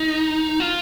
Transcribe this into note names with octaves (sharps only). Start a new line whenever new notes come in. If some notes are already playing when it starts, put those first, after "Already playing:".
Already playing: D#4
F4